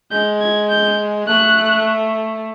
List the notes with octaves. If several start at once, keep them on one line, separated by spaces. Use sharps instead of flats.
G#3 G6
G#6
G6
A3 F#6